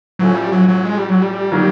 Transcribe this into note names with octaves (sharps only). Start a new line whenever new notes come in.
A2 F3 F#3 A3 C#4
G3
F#3
F#3
G#3
G3
F#3
G3
D#3 F#3 A#3